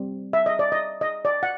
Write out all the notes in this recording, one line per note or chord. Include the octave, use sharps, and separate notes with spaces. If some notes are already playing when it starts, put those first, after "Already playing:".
Already playing: G3 C4
E5
D#5
D5
D#5
D#5
D5
F#5